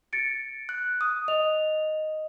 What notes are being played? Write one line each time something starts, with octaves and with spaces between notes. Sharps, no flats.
A6 C#7 D7
F#6
D#6
D#5 F7